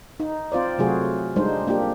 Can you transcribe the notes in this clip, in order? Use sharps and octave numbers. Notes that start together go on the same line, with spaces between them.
D#4
C4 F4 C5 D5
C3 F#3 A3 F4 F#4 G#4
G3 G#3 D4 D#4 C5
A#3 D4 F4 G4